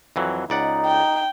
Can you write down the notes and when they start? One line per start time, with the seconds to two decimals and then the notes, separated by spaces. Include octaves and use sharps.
0.16 F2 E3 F#3
0.50 C#2 D#4 D5 F#5
0.85 G5